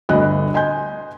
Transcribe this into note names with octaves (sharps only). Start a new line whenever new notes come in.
G1 D2 D#5 F#6
D#5 G#5 C6 G6